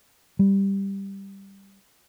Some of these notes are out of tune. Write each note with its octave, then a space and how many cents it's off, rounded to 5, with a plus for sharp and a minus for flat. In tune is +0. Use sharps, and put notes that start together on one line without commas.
G3 +5